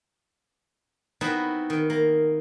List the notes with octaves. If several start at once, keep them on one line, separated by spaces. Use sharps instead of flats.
B3 C4 D#4 E4 F#4
D#3
A#3